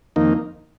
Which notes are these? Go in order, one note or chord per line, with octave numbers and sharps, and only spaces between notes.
F2 D#3 A#3 D#4